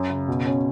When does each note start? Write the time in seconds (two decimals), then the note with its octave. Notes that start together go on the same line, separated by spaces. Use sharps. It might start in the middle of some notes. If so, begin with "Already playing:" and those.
Already playing: F#2
0.10 C#3
0.28 B2
0.46 C#4